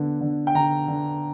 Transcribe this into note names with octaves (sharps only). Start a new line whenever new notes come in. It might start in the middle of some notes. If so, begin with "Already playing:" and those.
Already playing: D3 B3
D3
G5
D3 A#5
D3